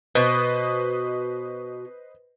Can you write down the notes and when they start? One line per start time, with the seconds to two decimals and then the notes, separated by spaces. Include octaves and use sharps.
0.15 B2 B4 C5 D#5